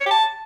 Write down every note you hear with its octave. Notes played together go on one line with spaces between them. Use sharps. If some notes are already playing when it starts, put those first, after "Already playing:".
C#5
G4
A5